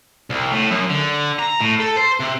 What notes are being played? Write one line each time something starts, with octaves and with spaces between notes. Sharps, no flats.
C2
A2
F#2
D3
A#5
A2
A4
C5
C3